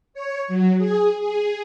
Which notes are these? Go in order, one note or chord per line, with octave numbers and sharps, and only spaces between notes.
C#5
F#3
G#4
G#4